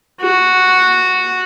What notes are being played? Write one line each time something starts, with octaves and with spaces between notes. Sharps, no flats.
F#4